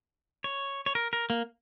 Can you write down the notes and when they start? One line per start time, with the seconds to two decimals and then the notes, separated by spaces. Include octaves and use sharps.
0.44 C#5
0.86 C#5
0.95 A#4
1.13 A#4
1.30 A#3